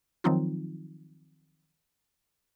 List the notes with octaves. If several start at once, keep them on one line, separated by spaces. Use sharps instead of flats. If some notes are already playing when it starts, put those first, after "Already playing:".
D#3 F3 F#3 C4 D#4 F4